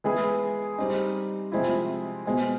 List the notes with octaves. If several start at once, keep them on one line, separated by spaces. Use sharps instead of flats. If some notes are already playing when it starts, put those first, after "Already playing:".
E3 G#3 B3 E4 G#4
G3 C4 D#4
C3 F3 G#3 C4 E4
B2 G#3 C4